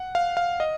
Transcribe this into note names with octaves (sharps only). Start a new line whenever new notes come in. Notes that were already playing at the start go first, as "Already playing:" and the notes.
Already playing: F#5
F5
F5
D#5